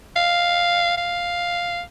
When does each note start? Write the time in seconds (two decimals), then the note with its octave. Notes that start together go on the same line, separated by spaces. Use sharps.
0.16 F5
0.98 F5